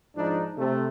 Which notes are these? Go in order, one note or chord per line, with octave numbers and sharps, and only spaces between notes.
G#2 F3 D4 D#4
C3 A3